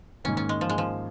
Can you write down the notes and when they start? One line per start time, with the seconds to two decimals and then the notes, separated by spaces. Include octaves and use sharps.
0.24 G#2 D#3 A#3 C#4
0.37 C#4
0.49 G#3
0.61 F3
0.69 G#3
0.78 F3